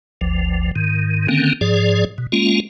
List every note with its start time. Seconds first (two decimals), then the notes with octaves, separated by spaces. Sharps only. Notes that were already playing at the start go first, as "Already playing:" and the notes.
0.21 G1 D2 F3
0.76 G#2 D#3
1.28 D3 D#3 A#3 C4 C#4
1.61 G#2 F3 G#4 D5
2.18 B2
2.32 G#3 A#3 C#4 F4